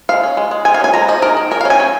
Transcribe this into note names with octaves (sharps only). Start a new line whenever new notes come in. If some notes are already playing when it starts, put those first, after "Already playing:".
G#3 F5
C#4
G#3
G#3
G#3 G#5
F5
C#4 G#5
G#3 A#5
F3 D#5
D#3 A#4
D#3
C#4 A#4
F5
C#4
G#5
C#4